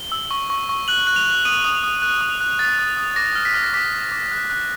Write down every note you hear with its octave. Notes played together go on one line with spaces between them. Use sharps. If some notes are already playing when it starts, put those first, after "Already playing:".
Already playing: G7
E6
C#6
C#6
C#6
F#6 F#7
F#6
F7
F#6
D#6 D#7
D#6
D#6
F#6
D#6
F#6
F#6 A6
D#6
D#6
D6 A#6
F6
B6
F6
A#6
D6 B6
F6
D6
F#6
F#6